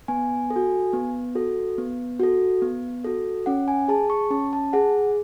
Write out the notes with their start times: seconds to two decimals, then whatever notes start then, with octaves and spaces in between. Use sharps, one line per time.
0.08 B3 G#5
0.50 A4
0.56 F#4
0.93 B3
1.35 F#4 A4
1.78 B3
2.20 F#4 A4
2.62 B3
3.04 F#4 A4
3.46 C#4 F#5
3.68 G#5
3.88 G#4 A5
4.10 C#6
4.31 C#4 A5
4.53 A5
4.73 G#4 F#5